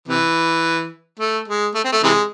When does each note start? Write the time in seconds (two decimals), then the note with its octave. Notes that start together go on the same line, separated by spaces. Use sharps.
0.08 C3 E3
1.19 A3
1.48 G#3
1.75 A3
1.85 C4
1.92 A3
2.03 C3 E3 G#3